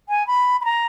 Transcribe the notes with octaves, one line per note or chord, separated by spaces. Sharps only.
G#5
B5
B5
A#5